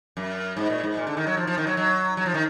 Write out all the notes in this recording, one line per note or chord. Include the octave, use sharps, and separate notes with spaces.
F#2
G#2
A#2
G#2
A#2
D3
D#3
F#3
F3
F3
D#3
F#3
F#3
F#3
F3
D#3